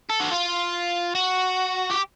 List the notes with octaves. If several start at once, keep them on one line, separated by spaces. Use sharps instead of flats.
A4
F#4
F4
F#4
G4